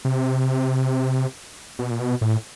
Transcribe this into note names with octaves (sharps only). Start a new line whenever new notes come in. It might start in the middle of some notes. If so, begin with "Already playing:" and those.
C3
B2
A#2
B2
A2